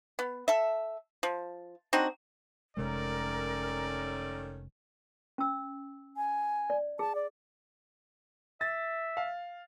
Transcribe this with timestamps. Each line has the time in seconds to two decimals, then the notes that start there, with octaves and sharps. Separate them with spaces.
0.19 B3
0.48 A4 E5
1.23 F3
1.93 C4 D4 D#4 F#4
2.77 F1 C3 D#3 G#3 A3 C#4 A#4 D5
5.38 C#4 E6
6.17 G#5
6.70 D5
6.99 G#4 A5
7.15 D5
8.61 E5 A6
9.17 F5